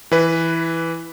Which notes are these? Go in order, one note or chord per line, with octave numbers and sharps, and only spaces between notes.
E3 B4